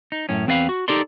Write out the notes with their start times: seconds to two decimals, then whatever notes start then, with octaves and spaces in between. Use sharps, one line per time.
0.12 D#4
0.29 F#2 A2 C#4
0.47 E2 C4 B4 D5 F5 B5
0.69 F#4
0.88 D#4 G4 A4 A#4 D5 C6